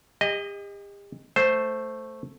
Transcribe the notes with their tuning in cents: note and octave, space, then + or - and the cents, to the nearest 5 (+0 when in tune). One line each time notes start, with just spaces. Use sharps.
G4 +40 D#5 +0
A3 +0 C5 +0